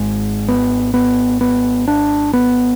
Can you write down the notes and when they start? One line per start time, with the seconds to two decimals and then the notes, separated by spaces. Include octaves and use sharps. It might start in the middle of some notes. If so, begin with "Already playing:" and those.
Already playing: G#1 G#2 G#3
0.48 B3
0.94 B3
1.41 B3
1.88 D4
2.33 B3